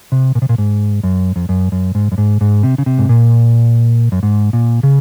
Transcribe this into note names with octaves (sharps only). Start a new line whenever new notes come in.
C3
A#2
C3
A#2
G#2
F#2
F2
F#2
F#2
G#2
F#2
G#2
G#2
C3
C#3
C3
G#2
A#2
F#2
G#2
A#2
C#3